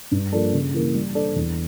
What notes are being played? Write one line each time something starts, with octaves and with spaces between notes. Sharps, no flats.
G2
F3 A#3 D4 A4
C#3
E3 A#3
G3
D4 A4 D5
E2